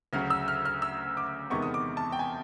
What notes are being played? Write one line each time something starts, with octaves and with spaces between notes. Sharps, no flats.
D2 C#3 F#3 F6
E6
F6
F6
E6
D6
E2 C3 D#3 G#3 B3 C#6
D#6
D6
A5
G5
G#5